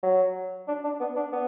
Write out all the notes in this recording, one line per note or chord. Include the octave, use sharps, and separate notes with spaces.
F#3
D4
D4
B3
D4
B3